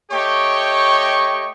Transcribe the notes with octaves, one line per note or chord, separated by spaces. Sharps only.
A3 G4 C#5 D#5 G5 C#6